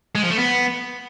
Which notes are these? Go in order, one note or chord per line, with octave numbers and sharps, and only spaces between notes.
G#3
F3
A3
B3